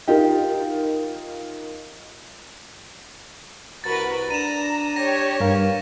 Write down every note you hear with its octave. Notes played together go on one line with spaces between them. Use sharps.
D#4 F4 G4 A#4
C2 F#4 A#4 B4 A6
D4 A#5 D#7 E7
G4 C#5 A#6
G2 A#4 F5